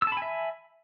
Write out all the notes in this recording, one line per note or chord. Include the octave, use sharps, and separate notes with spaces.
E5 G#5 A5 B5 E6